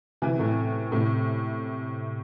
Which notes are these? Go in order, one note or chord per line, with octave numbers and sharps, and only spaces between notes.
C3 E3
A2 C3
A2 C3